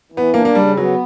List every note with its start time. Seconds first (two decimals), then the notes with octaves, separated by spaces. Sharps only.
0.12 E3
0.17 B3
0.33 A#3 D4
0.45 A#3
0.55 C#3 G3
0.77 F#3 B3